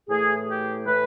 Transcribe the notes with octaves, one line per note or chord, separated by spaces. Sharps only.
A2 E3 A3 G#4
G4
A2 E3 A3 B4